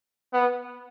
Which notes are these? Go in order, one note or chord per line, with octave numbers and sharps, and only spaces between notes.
B3